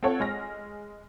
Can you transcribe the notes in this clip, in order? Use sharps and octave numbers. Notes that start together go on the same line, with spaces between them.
C4 F4 A4 C#5 F#5
G#3 F6 A#6